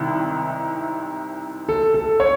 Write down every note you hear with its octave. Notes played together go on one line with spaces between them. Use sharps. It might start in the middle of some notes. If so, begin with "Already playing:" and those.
Already playing: C2 C3 D#3
A4
A4
C#5